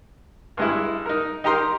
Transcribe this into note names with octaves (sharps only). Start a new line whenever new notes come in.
G2 G#3 E4
D#4 A#4
D#4 G4 A#4 A#5 C6